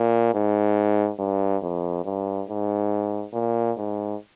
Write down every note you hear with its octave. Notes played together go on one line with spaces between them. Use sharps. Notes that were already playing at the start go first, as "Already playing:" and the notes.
Already playing: A#2
G#2
G2
F2
G2
G#2
A#2
G#2